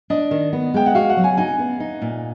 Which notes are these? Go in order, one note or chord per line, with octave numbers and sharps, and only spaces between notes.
D4 D#5
D#3
B3
G#3 G5
F#5
F#4 F5
F#5
F#3
G#5
D#4 G#5
B3
D#4
A#2